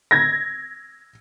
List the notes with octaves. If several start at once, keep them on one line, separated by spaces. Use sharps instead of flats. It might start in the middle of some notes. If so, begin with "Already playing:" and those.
G#6 A#6